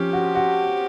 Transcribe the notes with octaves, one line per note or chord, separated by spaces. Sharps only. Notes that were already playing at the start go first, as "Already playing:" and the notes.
Already playing: F3 C#4 G4
F#4
F#4